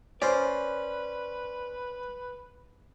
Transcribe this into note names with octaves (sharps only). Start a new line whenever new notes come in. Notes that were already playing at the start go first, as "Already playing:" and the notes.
C#4 B4 C5 D5